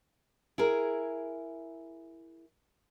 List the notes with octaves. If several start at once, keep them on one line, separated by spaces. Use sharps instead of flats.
E4 G#4 A#4